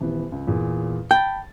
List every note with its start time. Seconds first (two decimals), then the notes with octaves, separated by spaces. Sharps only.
0.01 D#1 E3 B3
0.32 C#2
0.47 E2 A#2 G#4
1.11 G5 A5 B5 A6